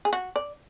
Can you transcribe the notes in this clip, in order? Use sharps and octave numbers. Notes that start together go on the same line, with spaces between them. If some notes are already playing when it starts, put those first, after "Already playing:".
G#4
F#4
D5